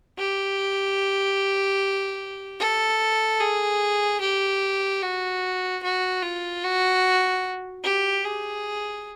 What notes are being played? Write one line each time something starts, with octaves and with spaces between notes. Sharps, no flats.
G4
A4
G#4
G4
F#4
F#4
F4
F#4
G4
G#4